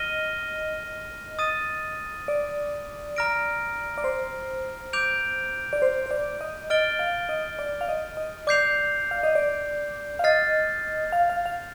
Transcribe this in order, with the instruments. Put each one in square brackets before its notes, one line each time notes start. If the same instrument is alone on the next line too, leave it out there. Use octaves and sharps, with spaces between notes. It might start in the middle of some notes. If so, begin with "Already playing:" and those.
Already playing: [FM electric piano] D#5 [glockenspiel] F6 A#6 D#7 G7
[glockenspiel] D#6 A6 D#7
[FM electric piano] D5
[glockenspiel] A#5 F6 A#6 D7
[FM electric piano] D5
C5
[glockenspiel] D6 G6 D7 F7
[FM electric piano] D5
C5
C5
D5
D#5
[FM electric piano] D#5 [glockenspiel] F6 A6 D7 G7
[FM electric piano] F5
D#5
D5
F5
D#5
D#5
[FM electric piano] D5 [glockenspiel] D6 G6 C7 F7
[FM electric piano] F5
D#5
D5
F5
[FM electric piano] D#5 [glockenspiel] F6 A6 C7
[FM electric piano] F5
F5
F5